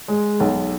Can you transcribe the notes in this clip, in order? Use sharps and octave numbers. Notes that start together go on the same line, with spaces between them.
G#3
B1